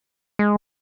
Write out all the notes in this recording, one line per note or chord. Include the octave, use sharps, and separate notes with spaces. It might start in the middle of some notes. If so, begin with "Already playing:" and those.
G#3